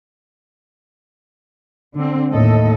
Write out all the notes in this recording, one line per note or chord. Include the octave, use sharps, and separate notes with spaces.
D3 C4
D#2 A2 A4 D#5